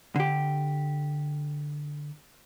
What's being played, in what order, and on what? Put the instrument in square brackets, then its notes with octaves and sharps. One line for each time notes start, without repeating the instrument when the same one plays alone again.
[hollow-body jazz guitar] D3 G4